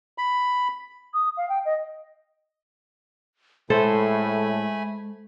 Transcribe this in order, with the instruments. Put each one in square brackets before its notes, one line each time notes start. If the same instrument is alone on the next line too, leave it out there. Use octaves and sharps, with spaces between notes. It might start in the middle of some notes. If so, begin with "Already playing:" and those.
[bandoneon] B5
[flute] D#6
F5
G5
D#5
[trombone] A2 [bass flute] G#3 [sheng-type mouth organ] A3 G#5 B5 [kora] A4 C5